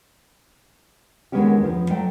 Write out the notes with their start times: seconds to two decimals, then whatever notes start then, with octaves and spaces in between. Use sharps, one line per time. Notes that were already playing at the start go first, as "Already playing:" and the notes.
1.32 D#2 D3 G#3 B3 C#4 G4
1.63 E2 F3
1.91 F#3 A3 G5